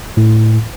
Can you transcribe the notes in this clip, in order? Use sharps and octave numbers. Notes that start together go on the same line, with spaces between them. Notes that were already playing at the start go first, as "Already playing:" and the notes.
A2